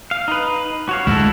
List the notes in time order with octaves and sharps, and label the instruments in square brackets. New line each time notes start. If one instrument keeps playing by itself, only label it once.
[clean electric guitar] F5
D#4 B4
F#4 C#5 F5
[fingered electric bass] D1 G#3 [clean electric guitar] E4 F#4 A4